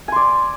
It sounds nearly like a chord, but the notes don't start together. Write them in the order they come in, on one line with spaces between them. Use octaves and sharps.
G#5 C6 D5